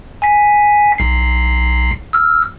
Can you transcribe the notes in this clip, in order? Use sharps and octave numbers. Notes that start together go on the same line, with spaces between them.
G#5 B6
B1 C7
E6 F6